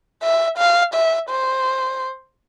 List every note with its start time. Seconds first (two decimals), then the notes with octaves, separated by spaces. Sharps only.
0.23 E5
0.58 F5
0.94 E5
1.29 C5